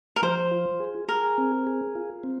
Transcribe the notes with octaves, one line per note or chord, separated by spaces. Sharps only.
A#4
F3 C5
F4
G#4
G#4 A#4
C4
G#4
F4
C4